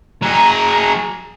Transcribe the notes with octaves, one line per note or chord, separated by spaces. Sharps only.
F#3 G#4 A#5